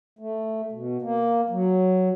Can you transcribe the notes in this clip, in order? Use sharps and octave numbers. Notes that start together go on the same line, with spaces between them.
A3
B2
A#3
F#3